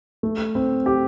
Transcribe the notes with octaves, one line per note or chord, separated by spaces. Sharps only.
A3
C4
G4